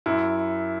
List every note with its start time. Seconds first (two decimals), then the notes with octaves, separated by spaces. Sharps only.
0.06 F#2 E4